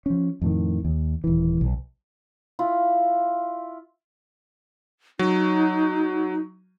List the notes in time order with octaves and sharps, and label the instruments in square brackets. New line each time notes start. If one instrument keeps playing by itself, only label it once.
[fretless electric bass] F3 C#4
F2 A2 D#3
D#2
D#1 E3
B1
[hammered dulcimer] E4 F4
[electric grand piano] F#3 [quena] D#4